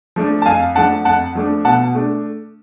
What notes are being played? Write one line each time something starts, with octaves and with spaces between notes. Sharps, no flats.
F3 A3 D4
A5
F2 F5 G#5
F3 A3 D4 F#5 A5
F2 F#5 A5
F3 A3 D4
B2 F#5 A5
A3 D4